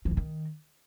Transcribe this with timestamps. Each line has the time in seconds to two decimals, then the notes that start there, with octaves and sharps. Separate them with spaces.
0.05 F3
0.11 C3
0.17 D#3